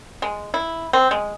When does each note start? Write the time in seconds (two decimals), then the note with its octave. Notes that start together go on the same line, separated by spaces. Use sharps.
0.22 G#3
0.54 E4
0.93 C4
1.11 G#3